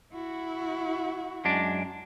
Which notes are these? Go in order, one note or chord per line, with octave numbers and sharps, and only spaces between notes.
E4 F#4
F#2 G#3 D4